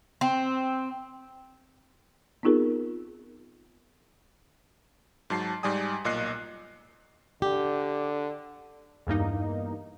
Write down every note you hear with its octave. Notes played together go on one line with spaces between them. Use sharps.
C4
B3 C4 D#4 F4 G#4 A#4
G#2 F#3 A5 C7
G#2 G3 D5 G#5 D#6
B1 A#2 D#5 F#6 C7
D3 G4
E2 G2 A#3 D#4